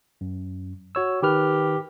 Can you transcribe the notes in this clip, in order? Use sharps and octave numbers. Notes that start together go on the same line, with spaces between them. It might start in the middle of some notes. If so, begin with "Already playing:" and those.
F#2
F#4 C#5 E6
D#3 G4 B4 F6